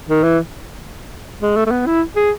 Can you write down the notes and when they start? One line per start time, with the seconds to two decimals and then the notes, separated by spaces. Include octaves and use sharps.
0.08 D#3
0.23 E3
1.42 G#3
1.56 A3
1.66 A3
1.71 B3
1.87 E4
2.16 G#4